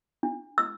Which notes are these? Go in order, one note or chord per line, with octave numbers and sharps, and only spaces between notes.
D4
E6